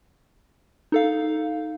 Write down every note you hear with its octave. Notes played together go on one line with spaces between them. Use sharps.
D#4 A4 F5